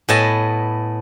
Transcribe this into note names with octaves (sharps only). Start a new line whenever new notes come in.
A2 B3 D#5 G#5 A5